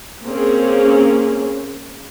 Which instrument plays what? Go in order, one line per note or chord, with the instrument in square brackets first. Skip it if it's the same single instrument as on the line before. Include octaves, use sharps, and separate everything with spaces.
[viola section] A#3 C4 C#4 G#4